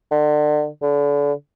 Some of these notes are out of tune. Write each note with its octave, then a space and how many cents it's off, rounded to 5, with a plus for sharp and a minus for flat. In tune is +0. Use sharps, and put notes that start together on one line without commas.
D3 +35
D3 -35